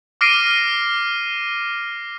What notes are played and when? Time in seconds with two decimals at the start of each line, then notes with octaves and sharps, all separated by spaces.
0.21 D6 F6 A#6 C7 D7 D#7